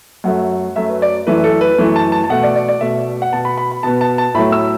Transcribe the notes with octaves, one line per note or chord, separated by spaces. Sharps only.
F#2 F#3 A3 F#5
F#2 F#3 A3 E5
B4
D5
F#2 E3 A3 B4
A4
B4
F#2 E3 A3
A5
A5
A5
B2 A3 F#5
D5
D5
D5
B2 A3 E5
F#5
B2 B3 A5
B5
B5
B5
B2 B3 A5
A5
A5
A2 F#3 A3 B5
E6